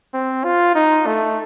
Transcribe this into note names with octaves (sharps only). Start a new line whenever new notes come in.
C4
F4
D#4
A3